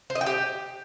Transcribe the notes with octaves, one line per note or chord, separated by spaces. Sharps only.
C5
D#5
G5
G4